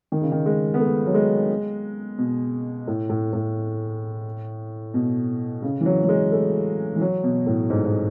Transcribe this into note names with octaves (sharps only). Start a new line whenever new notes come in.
D#3
C#3
D#3
G#3
B3
A3
F#3
G#3
B2
A2
A2
A2
B2
C#3
E3
F#3
F#3
G#3
A3
E3
F#3
B2
A2
G#2
G#2